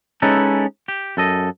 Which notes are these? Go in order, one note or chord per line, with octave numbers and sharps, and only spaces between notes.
G#3 C#4 D#4 E4 A4 B4
G4
F#2 A4 D#5